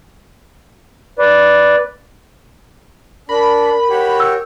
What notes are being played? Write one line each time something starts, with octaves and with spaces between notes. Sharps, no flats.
B4 D5
D4 A#4 B5
F#4 G4 C#5
E6